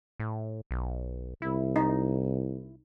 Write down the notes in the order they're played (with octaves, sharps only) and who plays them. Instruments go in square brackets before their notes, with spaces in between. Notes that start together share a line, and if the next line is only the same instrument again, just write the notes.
[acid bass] A2
B1
[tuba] C2 [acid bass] E4
[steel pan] D#4